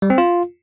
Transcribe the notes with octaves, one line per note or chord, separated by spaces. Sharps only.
G3
C4
F4